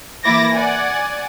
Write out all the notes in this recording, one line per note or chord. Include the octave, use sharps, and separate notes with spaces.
E3 A#3 E4 D6 A6 A#6
D5 F#5 G#5